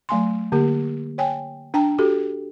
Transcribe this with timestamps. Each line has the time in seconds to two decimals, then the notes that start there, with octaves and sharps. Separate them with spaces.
0.09 F#3 A3 G#5 C6
0.52 D3 A#3 G4
1.18 C#5 G5 G#5
1.74 D4 G5 A5 A#5
1.99 F#4 G4 A4